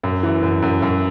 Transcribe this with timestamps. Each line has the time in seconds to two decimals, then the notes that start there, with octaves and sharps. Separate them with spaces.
0.03 F#2
0.23 E3
0.42 F#2
0.62 F#2
0.82 F#2